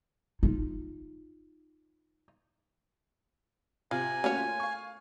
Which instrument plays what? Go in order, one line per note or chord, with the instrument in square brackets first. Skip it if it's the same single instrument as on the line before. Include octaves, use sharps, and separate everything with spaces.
[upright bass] D#4 F4
[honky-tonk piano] C3 [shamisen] F4 [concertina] G#5
[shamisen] A3 A#3 C#5 [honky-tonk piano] C#4 F#4
[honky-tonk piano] F4
F5 C#6